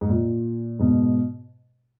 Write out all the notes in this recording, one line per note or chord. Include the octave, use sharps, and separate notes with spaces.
G#2
A#2
G#2 B2